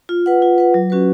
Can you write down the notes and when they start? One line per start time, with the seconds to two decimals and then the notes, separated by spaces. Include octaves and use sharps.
0.09 F4
0.26 B4 F#5
0.42 F4
0.58 B4 F#5
0.74 F#3
0.90 C#4 F#4 B4